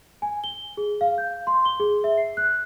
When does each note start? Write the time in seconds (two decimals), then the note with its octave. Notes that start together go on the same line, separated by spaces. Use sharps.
0.22 G#5
0.44 G7
0.77 G#4
1.01 F5
1.18 G6
1.47 C6
1.65 G7
1.80 G#4
2.04 E5
2.17 C7
2.37 F#6